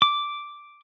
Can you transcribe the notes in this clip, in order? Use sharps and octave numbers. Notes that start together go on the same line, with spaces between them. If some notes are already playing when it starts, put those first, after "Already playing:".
D6